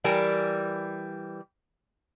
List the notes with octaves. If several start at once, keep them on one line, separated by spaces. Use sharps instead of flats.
E3 G3 A#4 G#5